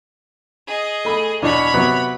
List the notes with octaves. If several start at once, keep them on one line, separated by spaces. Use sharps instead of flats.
G#4 D#5
A3 B5
E2 B2 D4 C#5 B5
C3 F#3 B3